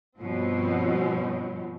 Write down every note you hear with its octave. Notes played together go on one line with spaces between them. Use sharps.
G2 B2 F3 C4 C#4